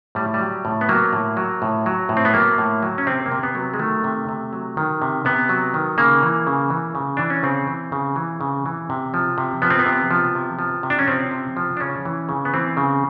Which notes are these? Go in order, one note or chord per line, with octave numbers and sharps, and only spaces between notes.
A2 G3
G3
F#3
A2
B3
F#3 A#3
A2
F#3
A2
F#3
A2
C4
B3
F#3 A#3
A2
F#3
C#4
C3 C4
A#3
C3
B3
F#3
G#3
D#3 A3
C3
C3
F#3
D#3
C3
C3 B3
F#3
D#3
C#3 A#3
E3
C#3
E3
C#3
E3 D4
C#4
C#3 C4
E3
C#3
E3
C#3
E3
C3
F3
C3
F3 B3
C4
B3
C3
F3
C3
F3
C3
D4
C#4
F3 C4
C3
F3
D4
C#3 C#4
E3
C#3
B3
E3 C4
C#3